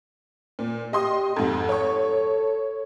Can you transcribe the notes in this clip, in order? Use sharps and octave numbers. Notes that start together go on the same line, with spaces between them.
A#2
G4 D#5 C6 D#6
F2 G#2 A4
C#5 C#6